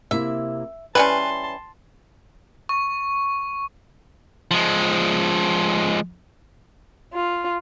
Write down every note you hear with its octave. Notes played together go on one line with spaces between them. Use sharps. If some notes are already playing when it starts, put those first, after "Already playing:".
C3 A#3 E4 E5
E3 G3 C#4 B4 G5 A5 C6
C#6
F3 G#3
F4